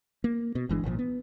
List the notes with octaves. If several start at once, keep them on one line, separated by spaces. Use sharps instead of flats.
A#3
B2
G1 E3 G#3 D4
G#1 A#2 D#3 F3
B3